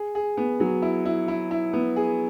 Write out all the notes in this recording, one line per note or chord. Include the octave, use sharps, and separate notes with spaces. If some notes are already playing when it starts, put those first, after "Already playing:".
Already playing: G#4
G#4
B3
F#3
E4
E4
E4
E4
B3
G#4